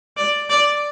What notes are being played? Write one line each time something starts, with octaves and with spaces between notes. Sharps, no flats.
D5
D5